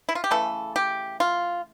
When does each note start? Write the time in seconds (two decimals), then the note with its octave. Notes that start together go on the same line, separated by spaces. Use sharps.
0.09 E4
0.15 F4
0.24 G4
0.31 C#3 E3 A3 A4
0.76 G4
1.20 F4